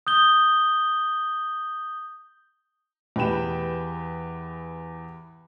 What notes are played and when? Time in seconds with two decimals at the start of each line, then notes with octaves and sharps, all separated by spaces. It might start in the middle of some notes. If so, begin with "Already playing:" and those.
0.07 D#6 G6 G7
3.16 E2 G4 B4 G5 E7